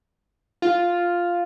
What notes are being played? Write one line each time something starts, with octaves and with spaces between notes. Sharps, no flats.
F4